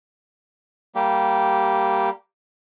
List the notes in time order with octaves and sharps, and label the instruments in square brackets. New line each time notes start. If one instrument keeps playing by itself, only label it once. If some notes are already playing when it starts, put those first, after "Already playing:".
[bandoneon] G3 A#3 G4